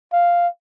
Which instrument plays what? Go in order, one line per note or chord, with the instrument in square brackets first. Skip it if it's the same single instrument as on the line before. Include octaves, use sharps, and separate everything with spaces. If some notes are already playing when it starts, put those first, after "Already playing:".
[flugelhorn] F5